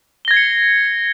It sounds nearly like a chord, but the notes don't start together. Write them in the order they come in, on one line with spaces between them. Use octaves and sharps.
G7 A#6 G#6 C7 C#7